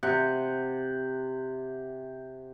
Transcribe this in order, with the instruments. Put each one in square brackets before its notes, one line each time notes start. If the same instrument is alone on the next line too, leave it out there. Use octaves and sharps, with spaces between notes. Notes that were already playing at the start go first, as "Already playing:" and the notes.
[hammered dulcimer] C3 F#5